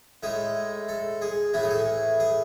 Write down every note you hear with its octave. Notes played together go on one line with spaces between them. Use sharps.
A2 G#3 G#4
A4
G#4
A2 E3 A3 G#4
A4
G#4
G#4